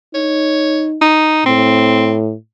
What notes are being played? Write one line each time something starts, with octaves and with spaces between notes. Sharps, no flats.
D#4 C#5
D#4
A2 C4